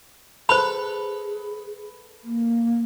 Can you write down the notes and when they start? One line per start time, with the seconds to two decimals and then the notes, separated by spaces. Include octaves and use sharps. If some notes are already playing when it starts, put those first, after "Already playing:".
0.49 G#4 A4 B4 C5 B5
2.23 A#3